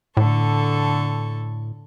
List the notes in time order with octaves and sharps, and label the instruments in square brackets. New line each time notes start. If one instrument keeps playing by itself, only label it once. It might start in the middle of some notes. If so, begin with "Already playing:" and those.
[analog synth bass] A2 [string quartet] D3 A4 C#6